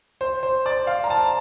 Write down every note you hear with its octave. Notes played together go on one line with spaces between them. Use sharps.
C5
C5
D5
F5
A#5
A5